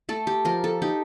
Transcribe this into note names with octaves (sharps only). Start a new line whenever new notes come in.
A3 A4
G4
F3 A#4
A4
D#4 G4